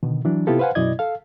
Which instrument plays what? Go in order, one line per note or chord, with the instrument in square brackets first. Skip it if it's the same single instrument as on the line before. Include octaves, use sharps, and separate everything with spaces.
[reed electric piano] B2 D3 D#3
E3 F#3 D4
C3 B3 E4 F4 G4 A4
B4 C5 F5 F#5 G#5
F#2 B2 E4 D5 D#5 G#6
A4 F5